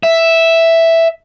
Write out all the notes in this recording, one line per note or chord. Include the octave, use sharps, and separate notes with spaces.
E5